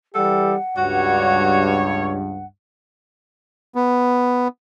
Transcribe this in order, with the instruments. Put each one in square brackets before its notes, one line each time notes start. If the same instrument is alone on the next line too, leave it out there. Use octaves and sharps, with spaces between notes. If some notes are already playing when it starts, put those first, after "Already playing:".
[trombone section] E3 G3 G4 [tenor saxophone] A4 [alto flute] F#5
[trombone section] C#2 G2 [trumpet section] G3 C#5 [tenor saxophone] F#4
[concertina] B3